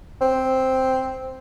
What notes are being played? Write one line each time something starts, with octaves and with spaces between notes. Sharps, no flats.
C4